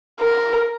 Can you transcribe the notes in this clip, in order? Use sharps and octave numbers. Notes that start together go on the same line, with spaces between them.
A#4